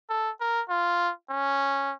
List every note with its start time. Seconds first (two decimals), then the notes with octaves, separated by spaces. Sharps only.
0.10 A4
0.40 A#4
0.69 F4
1.30 C#4